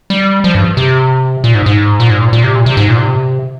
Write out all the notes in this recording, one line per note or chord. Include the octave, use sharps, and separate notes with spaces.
G3
F3
G2
C3
A#2
G#2
G#2
A#2
G#2
A#2
A#2
C3
A#2
C3
G#2
A#2
C3